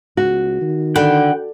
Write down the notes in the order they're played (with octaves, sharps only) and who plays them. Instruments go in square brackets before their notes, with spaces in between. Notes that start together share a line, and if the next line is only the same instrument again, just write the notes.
[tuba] C#2 [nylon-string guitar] F#4
[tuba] D#3
[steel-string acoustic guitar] D3 [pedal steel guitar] F#5 G5 B5